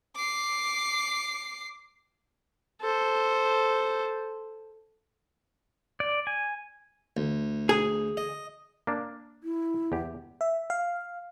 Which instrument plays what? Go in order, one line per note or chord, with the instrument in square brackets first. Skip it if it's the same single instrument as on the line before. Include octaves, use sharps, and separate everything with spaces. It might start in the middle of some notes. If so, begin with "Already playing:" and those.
[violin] D6 C7
[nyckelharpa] A4 C5
[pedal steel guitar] D5
G#5
[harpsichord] D2
[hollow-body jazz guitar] G#4
[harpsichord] D#5
[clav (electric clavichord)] A#3 D4
[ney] E4
[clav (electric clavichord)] E2 G4
[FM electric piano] E5
F5